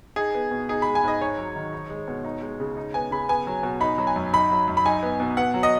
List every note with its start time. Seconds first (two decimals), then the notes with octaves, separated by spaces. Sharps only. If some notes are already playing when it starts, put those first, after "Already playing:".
0.16 D#4 G#4
0.34 B3
0.51 B2
0.69 D#4 G#4
0.82 G#3 B5
0.95 G#5
1.03 G#2 D#5
1.21 D#4 C#5
1.38 F#3
1.56 D#3
1.73 D#4
1.90 G#3
2.08 B2
2.25 D#4
2.42 G#3
2.60 C#3
2.77 D#4
2.94 B3 G#5
3.11 C#3 B5
3.29 B3 G#5
3.47 F#3
3.63 B2
3.80 D#4 B5
3.98 F#3
4.07 G#5
4.16 F#2
4.33 D#4 B5
4.51 F#3
4.68 F#2
4.77 B5
4.85 D#4 G#5
5.03 B3
5.20 B2
5.37 B3 F#5
5.54 F#3
5.63 D#5